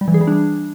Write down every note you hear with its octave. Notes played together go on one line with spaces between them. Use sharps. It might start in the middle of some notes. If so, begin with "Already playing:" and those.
G3
E3
G#4
G3
D4